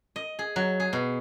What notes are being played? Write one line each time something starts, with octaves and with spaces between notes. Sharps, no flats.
D#5
G#4
F#3
G#4
B2